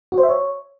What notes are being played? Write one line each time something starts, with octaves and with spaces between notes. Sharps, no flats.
F#4
C5
E5
C#5